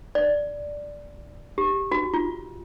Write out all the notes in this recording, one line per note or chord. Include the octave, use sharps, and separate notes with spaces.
D5
G4
F#4
F4